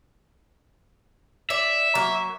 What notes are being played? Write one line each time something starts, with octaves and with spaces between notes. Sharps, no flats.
D5 E5
F#3 A#3